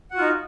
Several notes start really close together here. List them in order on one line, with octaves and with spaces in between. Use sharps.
F#5 F#4 F4 D#4